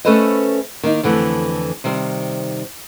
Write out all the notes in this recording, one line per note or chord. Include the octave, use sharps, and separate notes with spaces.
A3 C#4 A4 B4 C5 D#5
D#3 A#3 D#4
F2 D3 E3 A3
C3 D#3 G3 C5